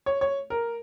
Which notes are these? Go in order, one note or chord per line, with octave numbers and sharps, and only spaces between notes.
C#5
C#5
A#4